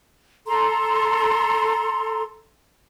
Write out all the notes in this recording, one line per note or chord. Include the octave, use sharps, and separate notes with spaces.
A4 A#5 C6